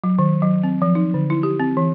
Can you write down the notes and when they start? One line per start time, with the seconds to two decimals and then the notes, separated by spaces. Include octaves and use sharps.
0.04 F#3
0.19 D#3
0.42 F#3
0.63 C4
0.82 F3
0.95 D#4
1.14 D3
1.30 E4
1.43 G4
1.60 C4
1.77 E3